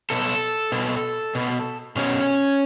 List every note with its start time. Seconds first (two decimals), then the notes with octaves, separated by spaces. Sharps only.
0.10 B2 A4
0.72 B2
1.35 B2
1.96 B2 C#4